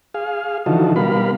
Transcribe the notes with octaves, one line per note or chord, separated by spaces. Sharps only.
G#4 F5
D3 E3 F3 D#4 F#4 A4
B2 G3 A#4 F5 B5